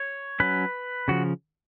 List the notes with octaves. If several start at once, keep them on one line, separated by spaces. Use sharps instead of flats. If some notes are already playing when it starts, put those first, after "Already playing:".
Already playing: C#5
F#3 C#4 B4
C#3 F3 F#4